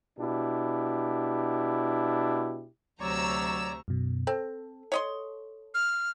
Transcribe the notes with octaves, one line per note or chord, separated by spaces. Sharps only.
B2 D4 E4 G4
D2 C3 F#3 C#5 D5 A#5 C#6 E6
F#2 B2
C4 A4
C#5 D#5 C6
F6